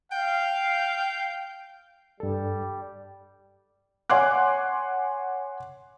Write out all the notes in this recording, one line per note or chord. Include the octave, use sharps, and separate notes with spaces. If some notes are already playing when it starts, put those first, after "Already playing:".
F5 G5
G2 G3 A4
C#5 F#5 G#5 C6 D6 F#6